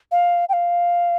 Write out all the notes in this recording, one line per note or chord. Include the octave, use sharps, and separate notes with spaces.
F5
G5
F5